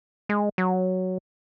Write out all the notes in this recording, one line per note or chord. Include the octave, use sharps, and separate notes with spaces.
G#3
F#3